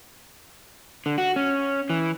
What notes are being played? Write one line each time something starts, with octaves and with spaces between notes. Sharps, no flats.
D3
F#4
C#4
E3